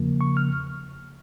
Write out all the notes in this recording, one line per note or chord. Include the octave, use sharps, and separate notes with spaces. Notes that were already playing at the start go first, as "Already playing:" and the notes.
Already playing: E2 C#3 F3 A#3
C#6
F6